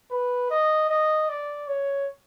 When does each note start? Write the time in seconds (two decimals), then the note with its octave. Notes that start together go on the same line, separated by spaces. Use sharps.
0.11 B4
0.50 D#5
0.90 D#5
1.29 D5
1.68 C#5